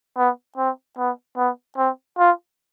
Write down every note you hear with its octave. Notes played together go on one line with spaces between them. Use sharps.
B3
C4
B3
B3
C4
F4